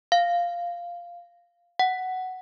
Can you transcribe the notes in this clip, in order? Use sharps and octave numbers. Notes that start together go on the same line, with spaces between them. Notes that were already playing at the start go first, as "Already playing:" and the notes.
F5
F#5